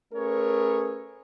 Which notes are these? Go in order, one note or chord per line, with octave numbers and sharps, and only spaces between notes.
A3 C#4 G#4 A#4 B4 C#5